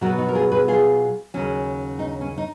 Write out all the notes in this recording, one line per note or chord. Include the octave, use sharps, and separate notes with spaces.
B2 F#3 B3 F#4 A#4
D#4 F#4
A#4
F4 G#4
G#4 B4
F4 G#4
D#2 C#3 F#3 C#4
D#4
C#4
D#4